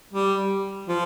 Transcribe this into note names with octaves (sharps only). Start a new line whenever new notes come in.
G3
F3